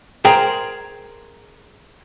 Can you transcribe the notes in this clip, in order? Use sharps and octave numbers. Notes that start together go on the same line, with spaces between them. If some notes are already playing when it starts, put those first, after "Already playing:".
G#4 A#4 C5 G5 A#5